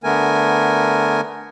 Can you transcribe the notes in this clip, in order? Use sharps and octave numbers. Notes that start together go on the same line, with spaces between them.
D3 A3 B3 A#4 G#5